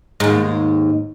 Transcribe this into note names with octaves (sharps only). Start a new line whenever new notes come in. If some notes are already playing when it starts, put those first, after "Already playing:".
D#2 G#2